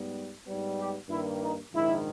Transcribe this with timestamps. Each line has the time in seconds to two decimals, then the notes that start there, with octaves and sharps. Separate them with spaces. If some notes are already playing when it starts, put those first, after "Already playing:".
Already playing: G#2 G3 B3
0.46 G#2 G3 B3
0.78 G4
1.09 G2 D#3 A#3 E4
1.41 D#4
1.72 A#1 G#2 D#3 E4